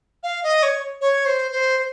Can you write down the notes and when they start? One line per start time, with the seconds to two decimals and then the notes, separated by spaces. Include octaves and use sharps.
0.23 F5
0.44 D#5
0.63 C#5
1.01 C#5
1.26 C5
1.52 C5
1.78 C5